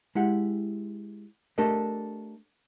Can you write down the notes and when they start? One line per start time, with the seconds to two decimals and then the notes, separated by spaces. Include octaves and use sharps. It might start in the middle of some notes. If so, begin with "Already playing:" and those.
0.15 G#3 E4 G4 F#5
1.58 A3 D4 G4 A4 A#4 D#5